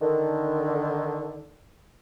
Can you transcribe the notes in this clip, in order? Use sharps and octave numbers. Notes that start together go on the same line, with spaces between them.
D3 D#3